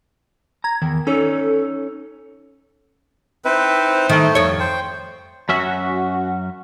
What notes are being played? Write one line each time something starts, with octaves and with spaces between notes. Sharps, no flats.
A#5 G#6
E2 D#3
C#4 D#4 A4 C#5
C4 D#4 E4 B4 C5
D#3 A3
F2 C#5
C5 G5
F#2 C#4 F#4 E5